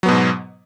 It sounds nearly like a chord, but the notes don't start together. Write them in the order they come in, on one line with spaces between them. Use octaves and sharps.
F#3 B3 B2 G#2